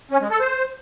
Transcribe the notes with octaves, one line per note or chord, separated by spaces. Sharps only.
C#4
G#3
A4
C5